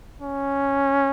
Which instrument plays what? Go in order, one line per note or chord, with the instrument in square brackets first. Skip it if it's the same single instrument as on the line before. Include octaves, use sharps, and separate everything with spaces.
[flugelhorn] C#4